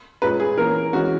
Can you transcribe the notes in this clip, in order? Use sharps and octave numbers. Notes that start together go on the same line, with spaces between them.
A#2 G#3 C#4 B4
G#4
E3 A#3 C#4 A#4
E3 G#3 C#4 F#4